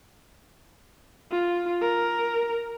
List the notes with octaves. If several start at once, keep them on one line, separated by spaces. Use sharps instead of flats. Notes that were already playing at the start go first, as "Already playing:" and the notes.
F4
A#4